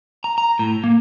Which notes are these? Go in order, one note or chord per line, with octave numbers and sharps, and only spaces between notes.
A#5
A#5
A2
A#3